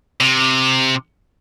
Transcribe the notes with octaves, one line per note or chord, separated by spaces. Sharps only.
C3